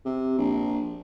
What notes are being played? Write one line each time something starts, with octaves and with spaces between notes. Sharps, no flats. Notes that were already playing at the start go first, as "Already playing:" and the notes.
C3
A#1